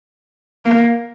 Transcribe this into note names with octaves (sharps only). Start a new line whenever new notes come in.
A#3